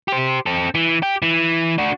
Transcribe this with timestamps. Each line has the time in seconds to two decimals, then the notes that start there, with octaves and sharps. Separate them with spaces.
0.08 G4 C5
0.46 C4 A4
0.75 E3
1.03 G4
1.22 E3
1.78 D4 F#4